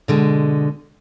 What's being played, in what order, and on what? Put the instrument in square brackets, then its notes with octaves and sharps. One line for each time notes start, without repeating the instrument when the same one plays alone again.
[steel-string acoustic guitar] B2 D3 G#3